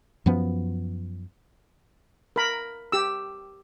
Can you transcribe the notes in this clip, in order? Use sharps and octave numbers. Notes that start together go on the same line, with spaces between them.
F#2 F3 B3
A#4 B5
G4 E6